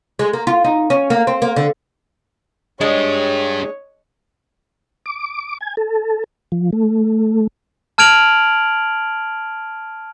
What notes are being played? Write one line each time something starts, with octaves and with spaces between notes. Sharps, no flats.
G#3
A#3
F4
D#4
C#4
A#3
C4
A#3
D3
G#3 D4 G4 C#5
D6
G#5
A4
F3
A3
A5 F6 G#6 D7 F7 F#7